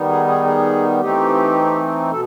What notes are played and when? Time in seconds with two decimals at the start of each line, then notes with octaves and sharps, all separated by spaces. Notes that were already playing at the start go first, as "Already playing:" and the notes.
Already playing: D#3 G3 B3 D#4
0.09 G#4
0.27 G#4
0.45 G#4
1.01 E3 A3 C4 D#4 G4
2.11 B2 A4